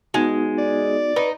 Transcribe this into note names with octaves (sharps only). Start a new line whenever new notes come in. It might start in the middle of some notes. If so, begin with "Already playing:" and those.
G#3 B3 D#4 F#4
D5
D#4 B4